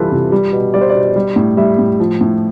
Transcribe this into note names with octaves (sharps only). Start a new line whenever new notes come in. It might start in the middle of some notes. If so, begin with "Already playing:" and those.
Already playing: C3 E3 G3 F4 A4 B4
C3
G3
B2
G3 D5
C5
D5
B2
G3
A2
G3 E5
A2
F3
A2